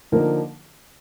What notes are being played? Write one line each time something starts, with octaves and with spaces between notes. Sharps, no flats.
D3 F3 A#3 D#4 A#4